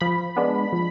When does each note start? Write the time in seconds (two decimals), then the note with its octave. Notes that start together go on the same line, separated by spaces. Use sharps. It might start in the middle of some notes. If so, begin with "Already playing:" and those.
0.01 F3 B5
0.37 G#3 B3 D4
0.73 F3